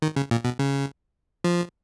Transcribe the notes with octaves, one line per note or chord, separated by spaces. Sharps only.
D#3
C#3
A#2
B2
C#3
F3